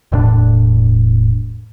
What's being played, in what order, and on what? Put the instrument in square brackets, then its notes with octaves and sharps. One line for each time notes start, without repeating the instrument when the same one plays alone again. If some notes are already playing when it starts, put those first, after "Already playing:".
[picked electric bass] E1 A2 D4